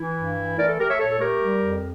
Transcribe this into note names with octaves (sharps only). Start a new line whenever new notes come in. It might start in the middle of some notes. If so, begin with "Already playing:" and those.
Already playing: E3 E4
G2
E3
A3 A#4 D5
A4
A3 G4 A#4
C#5 E5
A#2 A4 C#5
A4
A3 G4 A#4
G3
F2